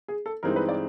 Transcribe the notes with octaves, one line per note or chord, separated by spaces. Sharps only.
G#4
A4
G2 E3 G#3 C4 D#4 A#4
B4
D5